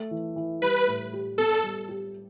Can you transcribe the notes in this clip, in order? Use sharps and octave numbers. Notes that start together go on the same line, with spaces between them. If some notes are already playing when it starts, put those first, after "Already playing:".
Already playing: A3
E3
E3
G3 B4
A2
G4
B3 A4
G3
G4